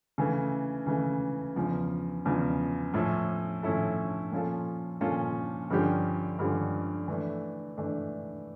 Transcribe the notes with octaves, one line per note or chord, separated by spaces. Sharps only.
C#3 E3 A3
C#3 E3 A3
E2 C#3 F3
E2 C#3 F3
A2 F3 C#4 E4 A4
A2 F3 C#4 E4 A4
A#2 F3 C#4 F4 A4
A#2 F3 C#4 F4 A4
G2 D3 F3 C#4 G4
G2 D3 F3 C#4 G4
E3 A3 D4
E3 A3 D4